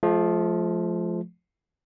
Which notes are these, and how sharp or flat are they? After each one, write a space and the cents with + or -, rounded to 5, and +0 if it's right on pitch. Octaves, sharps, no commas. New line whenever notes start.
F3 +0 A3 -45